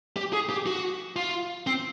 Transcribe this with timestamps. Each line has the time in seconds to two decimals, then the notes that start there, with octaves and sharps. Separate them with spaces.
0.17 G4
0.33 G#4
0.50 G4
0.67 F#4
1.16 F4
1.67 C4